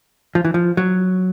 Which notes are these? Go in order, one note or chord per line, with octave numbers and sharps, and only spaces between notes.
F3
E3
F3
F#3